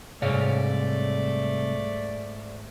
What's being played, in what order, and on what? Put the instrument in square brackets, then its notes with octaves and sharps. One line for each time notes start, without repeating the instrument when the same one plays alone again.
[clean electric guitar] C2 C#5 F5 [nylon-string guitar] G#2 [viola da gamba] A3 [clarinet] D5